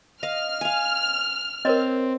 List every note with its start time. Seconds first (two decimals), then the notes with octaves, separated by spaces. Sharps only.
0.23 D#5 F5 F6
0.61 F5 G#5
1.65 C4 A#4 C#5 D#5